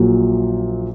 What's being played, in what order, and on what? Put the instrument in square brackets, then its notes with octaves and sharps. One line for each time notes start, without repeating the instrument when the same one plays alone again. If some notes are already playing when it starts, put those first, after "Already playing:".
Already playing: [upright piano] A#1 A#2 F#3